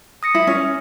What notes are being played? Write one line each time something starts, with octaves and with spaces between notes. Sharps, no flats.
D#6 A#6 C#7
E4
C#4